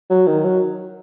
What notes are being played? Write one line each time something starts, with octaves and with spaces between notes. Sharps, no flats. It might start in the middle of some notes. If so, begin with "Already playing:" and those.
F#3
D#3
F#3